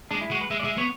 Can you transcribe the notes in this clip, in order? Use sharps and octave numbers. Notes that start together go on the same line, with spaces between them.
G#3 D4
E4
G#3 F#4
B4
G#3 E5
D5
G#3 E5
B3 C#5